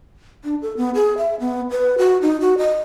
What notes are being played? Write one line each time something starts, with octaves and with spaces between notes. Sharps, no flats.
D4
A4
B3
G#4
E5
B3
B4
F#4
D#4
F#4
D#5